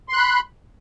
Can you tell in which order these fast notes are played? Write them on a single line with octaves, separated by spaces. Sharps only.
C6 F#6 B5